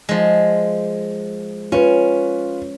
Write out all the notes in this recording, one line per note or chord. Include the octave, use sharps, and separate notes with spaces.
F3 G#3
C#4 F4 B4